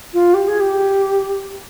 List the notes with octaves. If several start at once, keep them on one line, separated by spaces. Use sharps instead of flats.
F4
G4
G#4
G4